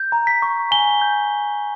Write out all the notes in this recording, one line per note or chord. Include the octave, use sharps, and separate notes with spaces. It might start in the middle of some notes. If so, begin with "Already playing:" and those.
Already playing: G6
A#5
B6
C#6
G#5 G7
G6